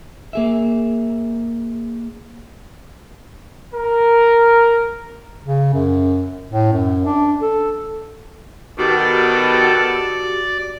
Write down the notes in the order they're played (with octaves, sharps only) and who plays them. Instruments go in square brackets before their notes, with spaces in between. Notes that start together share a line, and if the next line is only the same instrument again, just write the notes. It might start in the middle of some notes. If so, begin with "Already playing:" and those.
[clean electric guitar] A#3 G#4 E5
[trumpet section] A#4
[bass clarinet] C#3
F#2
A2
F#2
D4
A4
[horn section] B2 D#3 [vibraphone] F#4 G4 [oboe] A4 [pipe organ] D5